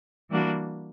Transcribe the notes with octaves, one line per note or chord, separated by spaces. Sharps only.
E3 G3 A#3 D4 F#4